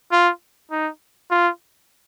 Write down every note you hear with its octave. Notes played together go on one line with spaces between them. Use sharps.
F4
D#4
F4